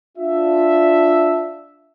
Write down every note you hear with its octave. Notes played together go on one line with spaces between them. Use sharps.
D4 F4 E5